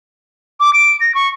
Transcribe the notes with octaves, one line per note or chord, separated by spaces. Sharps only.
D6
D7
A#6
C#6